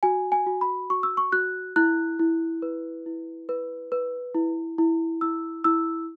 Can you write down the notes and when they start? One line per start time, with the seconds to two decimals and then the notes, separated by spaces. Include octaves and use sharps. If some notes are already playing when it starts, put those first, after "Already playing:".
0.03 F#4 G#5
0.32 G#5
0.47 F#4
0.61 B5
0.90 F#4 C#6
1.03 E6
1.17 C#6
1.32 F#4 F#6
1.76 E4 F#6
2.19 E4
2.62 B4
3.06 E4
3.49 B4
3.92 B4
4.35 E4
4.78 E4
5.21 E4 E6
5.64 E4 E6